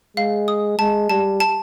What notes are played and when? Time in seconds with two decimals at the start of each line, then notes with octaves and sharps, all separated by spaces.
0.17 G#3 F5
0.48 D#6
0.79 G#3 A5
1.09 G3 A5
1.40 A5